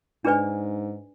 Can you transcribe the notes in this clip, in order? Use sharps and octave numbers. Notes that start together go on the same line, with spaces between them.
G#2 D4 G#4 B4 D5 G#5